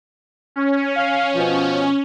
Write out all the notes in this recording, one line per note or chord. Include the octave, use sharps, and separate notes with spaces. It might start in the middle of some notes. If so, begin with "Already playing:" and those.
C#4
F5
B2 F3